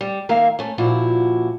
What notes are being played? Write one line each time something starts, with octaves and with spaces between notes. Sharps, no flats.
G3
D#3 A#3 E5 F5
A3 C#4
A#2 F3 E4 F#4